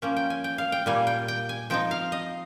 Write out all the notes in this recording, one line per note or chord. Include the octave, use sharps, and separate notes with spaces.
F3 A#3 C#4 G5
G5
G#5
G5
F5
G5
A#2 G3 A#3 G#5
G5
G5
G#5
F3 C4 D#4 G5
F5
D#5